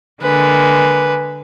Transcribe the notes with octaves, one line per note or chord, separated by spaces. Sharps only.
D3 G#3 A#3 B4